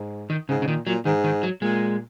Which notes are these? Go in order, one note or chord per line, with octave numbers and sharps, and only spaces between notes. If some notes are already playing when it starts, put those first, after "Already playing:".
Already playing: G#2
D#3
G#2 C#3
C#3
A#2 D#3
A#2 F#3
G#2 D#3
D#3
F#3
A#2 G#3